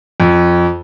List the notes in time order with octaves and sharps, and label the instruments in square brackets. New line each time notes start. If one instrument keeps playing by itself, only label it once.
[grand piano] F2